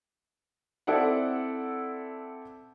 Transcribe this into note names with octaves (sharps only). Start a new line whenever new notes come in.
C4 E4 A4 D5 F#5